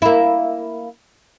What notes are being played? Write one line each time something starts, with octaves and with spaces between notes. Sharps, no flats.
A#3 E4